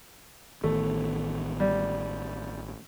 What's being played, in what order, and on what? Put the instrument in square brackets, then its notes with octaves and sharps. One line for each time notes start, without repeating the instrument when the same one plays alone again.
[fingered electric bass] A1 D#3 B3 [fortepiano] A3
[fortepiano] G3